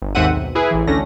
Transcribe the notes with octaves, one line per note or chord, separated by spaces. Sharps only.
G1
D#2 G#2 C4 E5 F#5 D#7
B1
E4 G#4 B4
A1 E3
D2 A3 C#4 D4 A#6